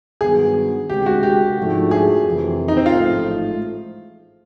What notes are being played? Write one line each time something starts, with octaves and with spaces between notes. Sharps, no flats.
G2 D#3 F#3 B3 G#4
D2 C3 E3 G#3 G4
F#4
G4
G#2 F3 A3 D4 F#4
G#4
F2 C3 E3
D#4
C4
F4
A1 G#2 F3 A3